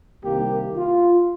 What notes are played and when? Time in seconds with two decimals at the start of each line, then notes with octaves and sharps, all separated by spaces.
0.24 C2 C3 D#3 A#3 G4
0.76 F4